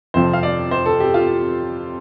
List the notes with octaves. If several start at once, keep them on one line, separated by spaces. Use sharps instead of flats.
F2 C3 F3 C5
F5
D5
C5
A4
G4
F4